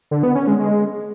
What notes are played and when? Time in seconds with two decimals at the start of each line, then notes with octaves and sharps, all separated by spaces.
0.11 D3
0.23 B3
0.35 C#4
0.47 G#3
0.59 G#3